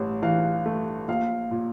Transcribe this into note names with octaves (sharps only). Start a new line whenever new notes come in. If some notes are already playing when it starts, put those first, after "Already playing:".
Already playing: A1 G2
E3 F5
A3
A#1 F5
A#2